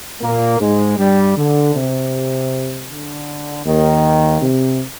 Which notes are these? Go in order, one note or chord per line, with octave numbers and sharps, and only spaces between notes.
A#2 A#3
G#2 G#3
G2 G3
D3
C3
D3
D#2 D#3
C3